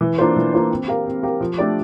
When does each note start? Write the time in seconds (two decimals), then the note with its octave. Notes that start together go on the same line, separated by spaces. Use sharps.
0.01 E3
0.18 A#3 D4 F4 C5
0.36 E3
0.54 A#3 D4 F4 C5
0.71 C4
0.88 G4 A#4 F5
1.05 C4
1.23 G4 A#4 F5
1.41 F3
1.58 A3 D4 G4 D5